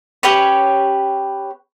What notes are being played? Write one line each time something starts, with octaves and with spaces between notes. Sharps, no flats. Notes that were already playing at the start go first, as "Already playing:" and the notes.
C#4 G4 B4 C#5